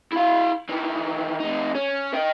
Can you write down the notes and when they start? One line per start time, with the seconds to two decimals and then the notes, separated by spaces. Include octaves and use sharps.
0.12 E4 F5
0.69 D#3 E3
1.40 F2 D#4
1.75 C#4
2.14 D#5 G5